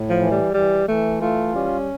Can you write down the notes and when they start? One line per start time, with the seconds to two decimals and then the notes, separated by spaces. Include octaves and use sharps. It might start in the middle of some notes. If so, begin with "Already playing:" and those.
Already playing: A2
0.10 F3
0.21 E3
0.31 G3
0.54 E3 G3
0.87 E3 A3
1.21 A3 F4
1.54 G3 C#4